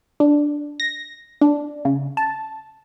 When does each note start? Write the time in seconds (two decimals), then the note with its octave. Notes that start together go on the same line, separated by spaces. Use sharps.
0.20 D4
0.80 A#6
1.41 D4
1.85 C#3
2.17 A5